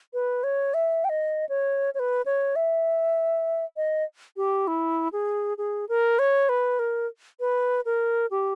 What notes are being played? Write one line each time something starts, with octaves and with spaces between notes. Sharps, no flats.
B4
C#5
E5
G5
D#5
C#5
C#5
B4
C#5
E5
D#5
G4
E4
G#4
G#4
A#4
C#5
B4
A#4
B4
A#4
G4